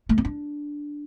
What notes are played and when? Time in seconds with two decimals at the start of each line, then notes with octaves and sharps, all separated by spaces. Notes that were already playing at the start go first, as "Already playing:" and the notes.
0.09 A3
0.18 C4
0.25 D4